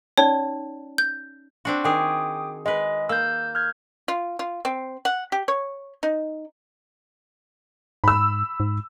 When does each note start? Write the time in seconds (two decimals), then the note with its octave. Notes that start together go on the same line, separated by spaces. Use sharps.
0.18 C#4 D#4 C#5 D5
0.98 G6
1.65 C4 D4 F#4
1.84 D#3 G#4 G5 D6 D#6
2.66 G#3 B4 D#5
3.09 A#3 E6 G6
3.55 F6 G6 G#6
4.08 F4
4.39 F4
4.65 C4
5.05 F#5
5.32 G4
5.48 C#5
6.03 D#4
8.04 G#2 B5 E6
8.60 G#2